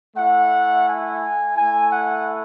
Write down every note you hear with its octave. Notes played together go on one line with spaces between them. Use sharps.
A3 E4 F#5
G#5
A3 E4 G#5
F#5